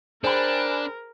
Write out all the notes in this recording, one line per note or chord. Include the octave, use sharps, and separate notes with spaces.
D4 G#4 A#4 C5 G5 G#5 B5 F#6